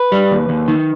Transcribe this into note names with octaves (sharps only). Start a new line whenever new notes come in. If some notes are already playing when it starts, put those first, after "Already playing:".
Already playing: B4
G3
D#2
D#2
D#3